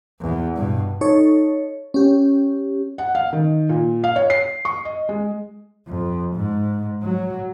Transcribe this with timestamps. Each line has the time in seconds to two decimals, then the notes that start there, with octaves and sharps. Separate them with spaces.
0.21 E2
0.57 G2 B2
1.01 D#4 A4 C#5
1.94 C#4 G4
2.98 F#5
3.15 F5
3.33 D#3
3.69 A#2
4.04 F5
4.16 C#5
4.30 C7
4.65 C#6
4.85 D#5
5.09 G#3
5.88 F2
6.36 G#2
7.03 F#3